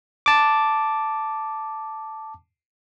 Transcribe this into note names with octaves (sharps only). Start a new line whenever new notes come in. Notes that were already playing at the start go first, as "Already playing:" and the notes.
A5 D6